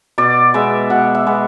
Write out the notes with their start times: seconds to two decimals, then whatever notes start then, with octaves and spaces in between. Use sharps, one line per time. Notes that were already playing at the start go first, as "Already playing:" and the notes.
0.18 B2 D5
0.54 G#3 B3 E5
0.90 B2 F#5
1.15 E5
1.27 G#3 B3